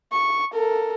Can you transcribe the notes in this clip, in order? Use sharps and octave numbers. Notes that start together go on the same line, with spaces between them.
C#6
A4 A#4